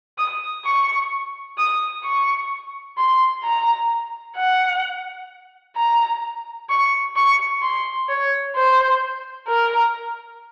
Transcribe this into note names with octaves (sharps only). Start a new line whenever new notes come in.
D#6
C#6
D#6
C#6
C6
A#5
F#5
A#5
C#6
C#6
C6
C#5
C5
A#4